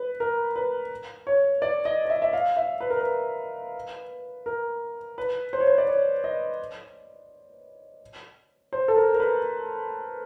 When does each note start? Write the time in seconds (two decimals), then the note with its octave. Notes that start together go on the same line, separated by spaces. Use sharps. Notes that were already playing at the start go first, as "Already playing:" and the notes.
Already playing: B4
0.20 A#4
0.56 B4
1.27 C#5
1.62 D5
1.85 D#5
2.05 D#5
2.10 E5
2.22 E5
2.33 F5
2.57 E5
2.80 B4
2.90 A#4
3.01 B4
4.46 A#4
5.18 B4
5.53 C5
5.60 C#5
5.67 C5
5.78 D5
5.88 C#5
6.24 D#5
8.73 C5
8.88 A4
8.97 A#4
9.14 A#4
9.20 B4